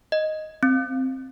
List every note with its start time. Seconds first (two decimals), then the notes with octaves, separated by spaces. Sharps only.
0.12 D#5
0.63 C4